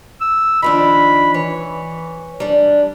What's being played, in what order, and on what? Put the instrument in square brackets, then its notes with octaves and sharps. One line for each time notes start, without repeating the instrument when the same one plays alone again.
[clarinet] E6
[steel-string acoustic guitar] D#3 F3 D4 [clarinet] B5
[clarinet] E3 [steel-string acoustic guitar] C#5
[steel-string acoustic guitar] G3 D4